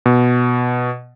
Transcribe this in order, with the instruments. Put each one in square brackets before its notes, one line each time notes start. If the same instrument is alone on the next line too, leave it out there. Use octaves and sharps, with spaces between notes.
[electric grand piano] B2